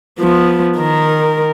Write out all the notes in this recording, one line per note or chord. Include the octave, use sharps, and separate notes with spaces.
F3 B3
D#3 A#4